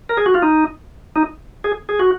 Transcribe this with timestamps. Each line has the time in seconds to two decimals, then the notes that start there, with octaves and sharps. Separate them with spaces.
0.09 A#4
0.17 G#4
0.26 F#4
0.34 F4
0.42 D#4
1.16 D#4
1.64 G#4
1.89 G#4
1.99 F#4